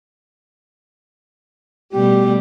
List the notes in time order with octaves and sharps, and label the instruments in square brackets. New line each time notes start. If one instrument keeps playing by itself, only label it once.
[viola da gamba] B2 G3 A3 [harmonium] G4